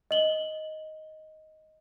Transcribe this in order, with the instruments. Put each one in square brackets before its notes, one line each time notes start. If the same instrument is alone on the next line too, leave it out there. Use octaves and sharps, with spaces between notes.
[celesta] D#5 F#7 G7